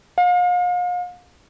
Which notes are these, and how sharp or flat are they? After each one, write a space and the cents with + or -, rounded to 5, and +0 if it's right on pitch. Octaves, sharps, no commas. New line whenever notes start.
F5 +40